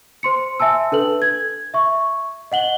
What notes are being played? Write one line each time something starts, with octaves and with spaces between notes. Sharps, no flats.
C5 C6 C#7
E5 G#5 A5 E6
D4 A4 B4 F#7
G#6
E5 C#6
D#5 F#5 F#7 G7